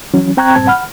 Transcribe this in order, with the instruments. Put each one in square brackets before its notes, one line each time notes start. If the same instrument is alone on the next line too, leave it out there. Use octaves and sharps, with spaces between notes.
[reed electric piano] E3 F#3 C#4
C4 G5 A#5 C#6 F#6 G#6
G2 A#2 G3 C4 A5 G#6
F#5 B5 F6